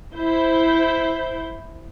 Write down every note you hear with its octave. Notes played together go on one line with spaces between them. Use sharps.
E4 C5 G6